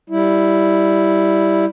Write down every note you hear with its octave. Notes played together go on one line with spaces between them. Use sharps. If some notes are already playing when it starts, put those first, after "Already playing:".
G3 E4